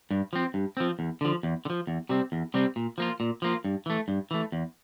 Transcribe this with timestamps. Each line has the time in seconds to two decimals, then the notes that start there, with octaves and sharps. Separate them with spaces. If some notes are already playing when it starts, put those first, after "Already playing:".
0.11 G2
0.33 F3 C4
0.54 G2
0.77 F3 C4
0.99 E2
1.21 D3 F3
1.43 E2
1.65 D3
1.70 F3
1.87 E2
2.09 C3 G3 C4
2.32 E2
2.54 C3 G3 C4
2.76 A#2
2.98 F3 A#3 F4
3.20 A#2
3.42 F3 A#3 F4
3.64 G2
3.86 E3 A3
4.08 G2
4.31 E3 A3
4.52 E2